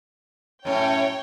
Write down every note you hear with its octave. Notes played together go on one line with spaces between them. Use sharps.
F#2 A2 C#4 C#5 G5